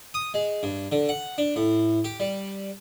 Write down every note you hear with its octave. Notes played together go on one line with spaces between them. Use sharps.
D#6
G#3
G2
D3
F#5
D4
A2
G4
G3